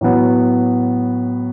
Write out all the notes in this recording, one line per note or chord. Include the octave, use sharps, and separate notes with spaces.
A2 F#3 B3